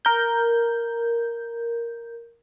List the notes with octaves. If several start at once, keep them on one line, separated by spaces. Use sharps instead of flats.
A#4 G6